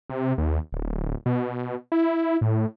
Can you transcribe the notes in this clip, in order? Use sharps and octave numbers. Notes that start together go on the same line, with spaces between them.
C3
D#2
D1
B2
E4
A2